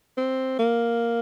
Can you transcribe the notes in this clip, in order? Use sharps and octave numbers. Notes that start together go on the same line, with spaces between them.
C4
A#3